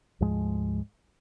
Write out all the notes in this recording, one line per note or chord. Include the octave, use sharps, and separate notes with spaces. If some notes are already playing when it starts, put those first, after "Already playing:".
D2 G#2 F3 G#3